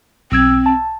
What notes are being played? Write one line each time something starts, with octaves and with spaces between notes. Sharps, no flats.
B1 C4 E6 G#6
A5